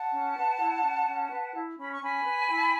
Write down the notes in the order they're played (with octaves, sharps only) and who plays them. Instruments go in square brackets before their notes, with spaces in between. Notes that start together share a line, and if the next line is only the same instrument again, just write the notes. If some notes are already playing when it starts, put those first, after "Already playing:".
Already playing: [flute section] F#5 A5
C#4
B4
E4
C#4
C#4
B4
E4
C#4 B5
C#6
C#4 G#5 B5
B4
E4